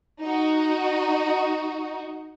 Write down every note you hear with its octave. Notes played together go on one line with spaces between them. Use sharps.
D#4 F#4